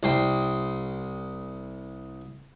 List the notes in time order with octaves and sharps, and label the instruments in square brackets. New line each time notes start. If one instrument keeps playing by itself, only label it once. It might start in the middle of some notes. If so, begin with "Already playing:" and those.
[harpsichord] C2 C5 G5